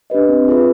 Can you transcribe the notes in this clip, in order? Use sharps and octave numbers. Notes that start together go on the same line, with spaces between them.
D4 G4 B4 D#5
C4
F4 G#4 B4 E5